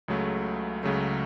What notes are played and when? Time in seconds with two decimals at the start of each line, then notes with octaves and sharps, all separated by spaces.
0.08 C#2 C#3 F#3 A3
0.83 C#2 C#3 F#3 A3